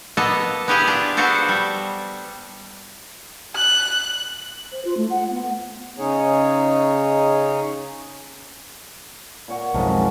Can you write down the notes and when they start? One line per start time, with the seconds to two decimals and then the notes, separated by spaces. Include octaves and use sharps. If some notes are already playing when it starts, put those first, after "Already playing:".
0.17 A#3 B3 A4 D#5 F5 A5
0.68 B3 E4 G4 G#4 B4 F5
0.87 D4 F4
1.17 B3 D4 F#4 A4 C5
1.49 G3
3.56 F#6
4.72 C5
4.85 F4
4.97 A3
5.10 F#5
5.31 B3
5.99 C#3 C#4 D#4 G#4 C#5
9.48 A#2 C#5 F#5
9.74 B1 F2 G#2 F3 G#3 A#4